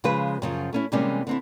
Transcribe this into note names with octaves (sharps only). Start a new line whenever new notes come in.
C#3 F3 G#3 G#4 B4
F#2 C#3 F3
A3 C#4 E4
C3 E3 G3 G#3 A#3 C#4
D3 C4 E4